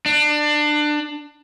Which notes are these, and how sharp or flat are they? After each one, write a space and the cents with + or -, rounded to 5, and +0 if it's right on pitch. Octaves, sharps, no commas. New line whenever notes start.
D4 +25